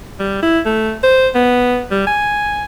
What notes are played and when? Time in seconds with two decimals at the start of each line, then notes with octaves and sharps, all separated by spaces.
0.20 G3
0.42 E4
0.66 A3
1.04 C5
1.35 B3
1.91 G3
2.07 G#5